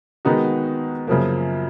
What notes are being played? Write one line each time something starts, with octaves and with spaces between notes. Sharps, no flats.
D#3 G#3 B3 D#4 F#4
F#2 C#3 F3 A#3